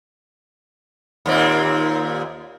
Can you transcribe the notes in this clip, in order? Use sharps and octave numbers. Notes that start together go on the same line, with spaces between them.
D#2 A#2 C4